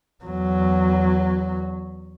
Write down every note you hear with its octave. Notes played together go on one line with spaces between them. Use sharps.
E2 F#3